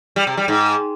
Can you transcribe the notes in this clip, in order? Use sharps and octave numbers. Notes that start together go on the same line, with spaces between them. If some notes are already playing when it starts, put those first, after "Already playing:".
G3
C3
G3
G#2